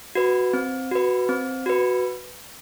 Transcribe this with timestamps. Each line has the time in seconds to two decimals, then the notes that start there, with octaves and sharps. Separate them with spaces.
0.15 F#4 B4
0.53 C4
0.91 F#4 B4
1.29 C4
1.66 F#4 B4